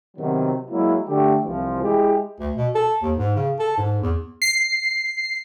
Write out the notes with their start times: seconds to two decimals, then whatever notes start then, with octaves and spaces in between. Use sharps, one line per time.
0.17 C3 D#3 F#3 B3
0.71 F#3 G#3 A#3 E4
1.07 D3 A3 G4
1.44 C2 E3 F3
1.82 G#3 E4 G4 G#4
2.40 D2
2.56 B2
2.75 A4
3.02 D#2
3.17 G#2
3.36 C#3
3.59 A4
3.78 G#2
4.02 E2
4.42 C7